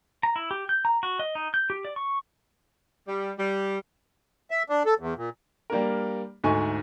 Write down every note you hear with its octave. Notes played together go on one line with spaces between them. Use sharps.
A#5
E4
G4
G6
A#5
F#4
D#5
D#4
G6
G4
D5
C#6
G3
G3
E5
D4
A4
E2
A#2
G3 A#3 D4 A#4
D2 G#2 A3 G#5 C#6